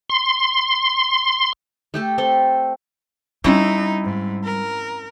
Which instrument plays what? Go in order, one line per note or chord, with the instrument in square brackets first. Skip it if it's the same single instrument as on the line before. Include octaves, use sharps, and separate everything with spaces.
[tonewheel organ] C6
[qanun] A3 G4 A4
C4 A4 C6
[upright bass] G3 [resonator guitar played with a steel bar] C4 C#4 E4 [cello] D#4
[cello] G#2
A#4